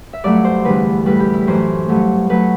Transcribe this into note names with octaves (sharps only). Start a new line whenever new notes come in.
E5
G2 F#3 A3 D5
C5
E2 D3 G3 B4
A2 G3 B4
G4
E4
F#2 E3 A3 C5
G2 F#3 A3
F#3 A3 B4